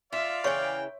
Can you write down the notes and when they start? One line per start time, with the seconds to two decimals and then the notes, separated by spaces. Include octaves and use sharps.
0.13 F4 D5 E5 F5
0.44 C#3 E3 C#5 G5 C6 C#6